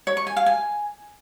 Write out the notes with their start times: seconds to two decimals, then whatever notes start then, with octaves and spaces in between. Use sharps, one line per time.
0.07 C#5
0.17 C#6
0.27 G#5
0.37 F5
0.46 G#5